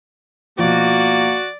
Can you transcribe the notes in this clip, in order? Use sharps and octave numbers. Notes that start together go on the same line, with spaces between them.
B2 F3 A#3 F#4 D5